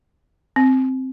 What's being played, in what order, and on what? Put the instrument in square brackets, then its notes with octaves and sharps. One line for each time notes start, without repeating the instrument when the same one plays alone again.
[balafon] C4